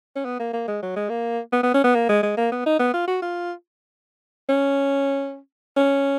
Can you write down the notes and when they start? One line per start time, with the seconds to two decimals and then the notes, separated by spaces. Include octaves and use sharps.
0.16 C#4
0.25 B3
0.39 A#3
0.53 A#3
0.68 G#3
0.82 F#3
0.96 G#3
1.10 A#3
1.53 B3
1.63 B3
1.74 C#4
1.84 B3
1.95 A#3
2.09 G#3
2.23 G#3
2.37 A#3
2.52 B3
2.66 D#4
2.79 B3
2.93 F4
3.08 F#4
3.22 F4
4.49 C#4
5.77 C#4